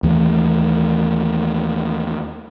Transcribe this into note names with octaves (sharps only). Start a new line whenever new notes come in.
D#2 E3 A3